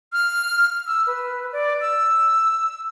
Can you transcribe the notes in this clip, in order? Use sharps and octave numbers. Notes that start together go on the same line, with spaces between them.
F6
E6
B4
D5
E6